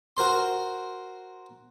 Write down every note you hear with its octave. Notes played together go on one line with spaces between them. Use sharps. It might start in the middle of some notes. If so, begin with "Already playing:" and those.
F#4 A#4 C5 C6